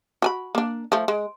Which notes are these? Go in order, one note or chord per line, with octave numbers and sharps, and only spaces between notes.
F#4 G#5 B5
A#3 D4
F3 A3
G#3